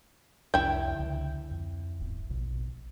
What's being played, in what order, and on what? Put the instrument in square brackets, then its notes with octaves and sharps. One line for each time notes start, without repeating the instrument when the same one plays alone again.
[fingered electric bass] C2 F2 [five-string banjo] E4 G5
[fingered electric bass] C#2 D3
F2
D1 G1
A#1 B2